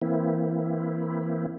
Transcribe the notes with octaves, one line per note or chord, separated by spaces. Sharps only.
E3 A#3 C4 E4